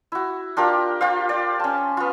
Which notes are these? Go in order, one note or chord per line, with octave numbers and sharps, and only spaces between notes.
E4 F#4
D4 F4 G4 A#4
F4 G4 C5 F5
D5
C#4 A5
B3 F4